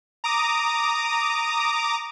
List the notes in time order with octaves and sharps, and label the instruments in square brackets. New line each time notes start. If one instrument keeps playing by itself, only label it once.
[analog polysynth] A#5 D6 D#6